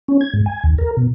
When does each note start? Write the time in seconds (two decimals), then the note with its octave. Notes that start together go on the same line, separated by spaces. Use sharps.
0.08 C#4
0.21 G#6
0.34 G#2
0.46 G#5
0.63 D#2
0.78 A#4
0.97 B2